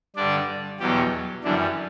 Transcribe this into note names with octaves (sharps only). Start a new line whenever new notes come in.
G2 D3 G3 D4 D5
E2 B2 F#3 G3 G4
F#2 D3 E3 G3 D4